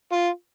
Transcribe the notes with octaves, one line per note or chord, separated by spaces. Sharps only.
F4